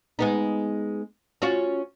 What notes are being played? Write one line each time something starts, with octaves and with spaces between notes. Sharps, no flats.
G#3 B3 D#4
C#4 F4 F#4